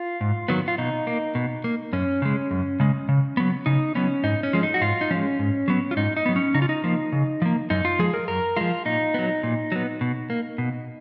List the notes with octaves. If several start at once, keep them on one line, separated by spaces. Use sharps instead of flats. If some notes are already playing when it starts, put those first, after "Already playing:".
Already playing: F4
G#2
D#3 F#3 B3
F4
B2 D#4
A#3
B2
A#3
F#2 C#4
C#3 G#3
F#2
C#3 G#3
C#3
F#3 B3
C#3 D#4
F#3 B3 C#4
G#2 D#4
C#4
F3 G#3
D#4
F#4
G#2 F4
D#4
F3 G#3 C#4
G#2
F#3 B3
F4
G#2 D#4
D#4
F#3 B3
C#4
C#3 D#4
F4
D#4
F3 A#3
C#3
F3 A#3
F#2 D#4
F4
F3 G#3 G#4
A#4
F#2 A#4
F3 G#3 F4
A#2 D#4
F#3 B3
A#2
F#3 B3
B2
A#3
B2